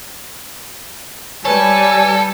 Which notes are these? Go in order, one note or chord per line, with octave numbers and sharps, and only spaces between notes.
G3 A4 B4 C#5 G#5